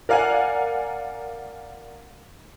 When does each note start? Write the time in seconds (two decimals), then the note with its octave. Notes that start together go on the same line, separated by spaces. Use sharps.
0.09 A#4 D5 F5 F#5 G#5